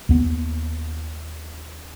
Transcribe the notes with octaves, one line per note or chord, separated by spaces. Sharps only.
D#2 B3